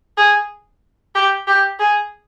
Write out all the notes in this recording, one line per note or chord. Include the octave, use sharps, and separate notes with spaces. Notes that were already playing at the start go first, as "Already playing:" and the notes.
G#4
G4
G4
G#4